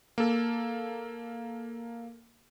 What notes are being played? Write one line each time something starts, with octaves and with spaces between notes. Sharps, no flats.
A#3 A4